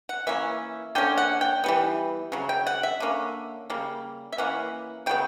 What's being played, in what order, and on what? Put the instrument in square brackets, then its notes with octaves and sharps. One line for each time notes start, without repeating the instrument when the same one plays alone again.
[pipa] F#5
E3 A#3 C#4 E5
D3 A#3 C#4 G5
F#5
G5
E3 G3 B3
C#3 F#3
G5
F#5
E5
D3 A#3 C#4
C#3 G3 A#3
E5
E3 A#3 C#4 F#5
C#3 F#3 B3 G5